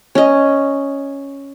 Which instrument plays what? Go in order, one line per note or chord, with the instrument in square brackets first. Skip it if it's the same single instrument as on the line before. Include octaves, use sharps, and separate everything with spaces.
[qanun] C#4 D#5